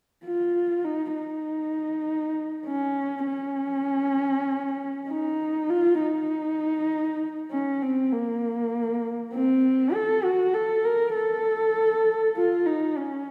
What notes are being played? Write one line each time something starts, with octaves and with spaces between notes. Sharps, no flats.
F4
D#4
D#4
C#4
C#4
D#4
F4
D#4
C#4
C4
A#3
C4
A4
F#4
A4
A#4
A4
F4
D#4
C#4